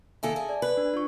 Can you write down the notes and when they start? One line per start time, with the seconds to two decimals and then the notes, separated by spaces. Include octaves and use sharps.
0.23 A#2 D#3 A4 E5 G#5 A5
0.36 G#4
0.49 D5
0.62 B4
0.77 D4
0.94 D4 F4 C#6